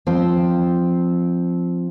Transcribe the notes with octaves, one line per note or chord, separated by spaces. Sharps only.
F3 C4